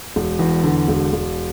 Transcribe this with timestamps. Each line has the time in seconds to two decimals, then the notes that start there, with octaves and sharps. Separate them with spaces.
0.16 E1
0.39 E2
0.64 D3
0.88 E1
1.13 E1